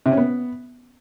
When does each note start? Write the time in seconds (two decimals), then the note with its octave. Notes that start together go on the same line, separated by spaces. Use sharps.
0.06 C3
0.11 C#4
0.17 B3